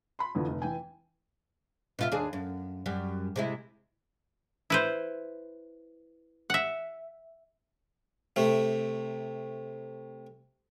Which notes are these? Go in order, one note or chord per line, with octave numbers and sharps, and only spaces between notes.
B5 C6
F2 D3 E3 F3
F1
E3 G5 G#5
B2 F4 E5
D#2 D4 G#4
F#2
F#2 G3
C3 G#3 E4
E4 B4 C5
E5 F#5
C3 A3